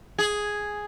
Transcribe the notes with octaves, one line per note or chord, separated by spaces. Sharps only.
G#4